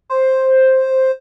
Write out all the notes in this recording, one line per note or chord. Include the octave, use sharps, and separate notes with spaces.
C5